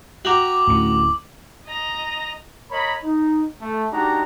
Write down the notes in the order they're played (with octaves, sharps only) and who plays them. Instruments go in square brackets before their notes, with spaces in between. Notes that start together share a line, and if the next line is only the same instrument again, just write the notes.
[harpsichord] F#4 G5 A#5 [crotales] D6 F#7
[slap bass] D1 C#4 [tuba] A2
[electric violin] D#5 A#5
[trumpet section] A#4 C#5 D#5 A#5 B5
D#4
A3
G#3 D4 D#4 F#4 G4 A#5